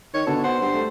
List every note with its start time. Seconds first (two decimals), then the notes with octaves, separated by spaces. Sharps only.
0.14 D#3 C#5
0.27 B2 D3 A4
0.44 C5 F#5
0.61 G2
0.74 A3